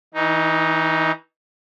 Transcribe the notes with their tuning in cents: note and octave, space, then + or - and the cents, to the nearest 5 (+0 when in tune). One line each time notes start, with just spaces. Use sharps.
E3 -30 D#4 +0